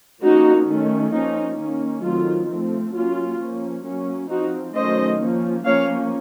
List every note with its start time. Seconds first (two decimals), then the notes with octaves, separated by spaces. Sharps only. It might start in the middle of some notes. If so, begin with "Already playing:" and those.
0.23 F3 A#3 C#4 D#4 F#4
0.69 D#3 A3 C#4
1.13 F3 A#3 C#4 D#4
1.59 D#3 A#3 C#4
2.03 D#3 F#3 A3 C4 F4
2.49 F3 A3 C4
2.94 F#3 A#3 C#4 F4
3.39 F3 A#3 C#4
3.85 F#3 A#3 C#4
4.30 F3 C4 D#4 F#4
4.75 D#3 F#3 A3 C#4 C5 D#5
5.20 F3 A#3 C#4
5.66 F3 A#3 C#4 C#5 F5